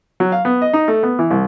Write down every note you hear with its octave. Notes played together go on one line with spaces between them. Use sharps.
F#3
F5
B3
D#5
D#4
A3
B3
E3
C2